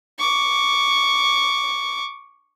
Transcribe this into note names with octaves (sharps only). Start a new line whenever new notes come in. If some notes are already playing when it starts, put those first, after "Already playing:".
C#6 D6